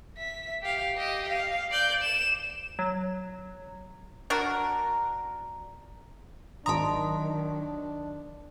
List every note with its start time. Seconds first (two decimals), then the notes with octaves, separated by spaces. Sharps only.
0.17 E5 B6
0.63 G4 F5
0.95 G4 D#5
1.30 F5
1.71 D5 G6
2.03 E7
2.79 F#3
4.30 D4 F#4 A#4
6.66 G#1 D#3 F#3 D4 A5 A#5 C6 D#6